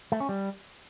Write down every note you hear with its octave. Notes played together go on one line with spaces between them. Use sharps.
A3
C#4
G3